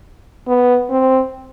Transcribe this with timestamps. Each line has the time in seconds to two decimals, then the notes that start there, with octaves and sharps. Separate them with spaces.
0.47 B3
0.90 C4